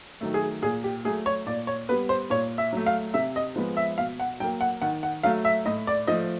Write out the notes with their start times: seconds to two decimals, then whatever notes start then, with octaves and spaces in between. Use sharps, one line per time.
0.21 D#3 F#3 A3
0.34 G#4
0.62 A#2 G#4
0.84 G4
1.05 F#3 A3 G#4
1.26 C#5
1.46 A#2 D5
1.67 C#5
1.89 G3 B3 B4
2.09 C5
2.30 A#2 C#5
2.58 E5
2.73 F#3 A3
2.86 F5
3.14 C3 E5
3.36 D#5
3.56 F3 G#3 B3
3.77 E5
3.98 B2 F5
4.20 F#5
4.40 F#3 G5
4.44 A#3
4.61 F#5
4.82 D#3 F#5
5.03 F#5
5.23 F#3 A3 F5
5.45 E5
5.66 A2 D#5
5.87 D5
6.07 F3 A3 D#5